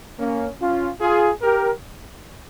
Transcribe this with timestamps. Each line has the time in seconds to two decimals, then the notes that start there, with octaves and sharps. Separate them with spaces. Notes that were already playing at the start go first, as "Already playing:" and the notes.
0.19 A#3 C#4
0.61 C#4 F4
1.01 F4 G#4
1.42 G4 A#4